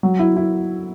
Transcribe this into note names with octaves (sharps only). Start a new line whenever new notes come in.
F#3
E4
E4